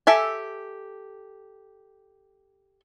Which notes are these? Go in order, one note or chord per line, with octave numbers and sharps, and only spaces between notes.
G4 A4 E5 G#5